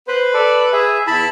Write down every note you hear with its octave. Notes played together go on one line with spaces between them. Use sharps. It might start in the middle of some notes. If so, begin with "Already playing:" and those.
B4 C5
A4 D5
G#4 E5
E2 E4 A5 B5